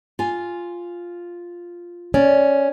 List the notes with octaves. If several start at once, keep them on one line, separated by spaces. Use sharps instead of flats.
F4 G#5
C#4 D5